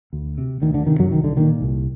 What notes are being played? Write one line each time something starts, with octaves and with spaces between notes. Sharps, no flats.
D2
C3
D2 D#3
D3
C3 D#3
F#2 F#3
C2 D#3
D3
A#2 D#3
C2